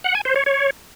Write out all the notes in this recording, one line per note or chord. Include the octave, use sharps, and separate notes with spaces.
F#5
G#5
C5
C#5
C#5